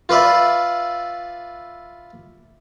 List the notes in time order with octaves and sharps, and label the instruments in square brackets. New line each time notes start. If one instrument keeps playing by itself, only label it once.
[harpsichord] F4 B4 D5 E5